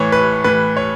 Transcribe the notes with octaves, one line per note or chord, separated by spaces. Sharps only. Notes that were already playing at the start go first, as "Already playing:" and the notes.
Already playing: A2 E3 C#5
B4
A2 E3 B4
C#5